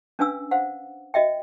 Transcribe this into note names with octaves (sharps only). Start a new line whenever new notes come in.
C#4 D4 B4 F5 G#5 E6
C5 F5 F#5
F#4 D#5 E5 G5